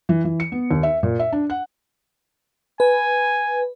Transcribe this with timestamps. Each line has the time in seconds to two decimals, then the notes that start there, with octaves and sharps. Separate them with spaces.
0.09 E3
0.25 E3
0.40 C#7
0.52 B3
0.71 D#2
0.83 E5
1.03 A#2
1.19 E5
1.32 D4
1.50 F#5
2.80 B4 G#5